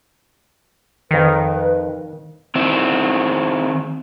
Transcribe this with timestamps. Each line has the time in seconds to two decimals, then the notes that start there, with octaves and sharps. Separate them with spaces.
1.11 F2 D#3 A#4 B4
2.55 D#3 C4 E4